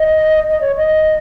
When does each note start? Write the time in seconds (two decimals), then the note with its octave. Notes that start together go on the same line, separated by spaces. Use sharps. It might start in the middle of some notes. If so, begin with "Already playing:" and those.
Already playing: D#5
0.49 D#5
0.61 C#5
0.76 D#5